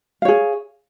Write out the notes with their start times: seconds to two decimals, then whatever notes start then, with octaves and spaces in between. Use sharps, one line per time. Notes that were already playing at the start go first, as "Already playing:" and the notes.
0.22 F5
0.25 C#5
0.28 G#4